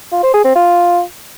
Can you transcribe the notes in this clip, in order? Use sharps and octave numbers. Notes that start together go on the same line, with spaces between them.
F4
C5
G#4
C4
F4